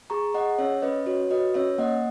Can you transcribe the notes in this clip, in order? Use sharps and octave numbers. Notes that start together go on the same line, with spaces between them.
G#4 A#5 C#6
G#4 D#5 F#5
C#4 C#5 E5
C#4 B4 D#5
F#4 C#5
F#4 B4 D#5
C#4 C#5 E5
A#3 D#5 F#5